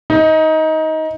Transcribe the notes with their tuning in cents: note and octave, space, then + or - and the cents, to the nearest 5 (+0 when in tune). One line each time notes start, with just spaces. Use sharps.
D#4 +20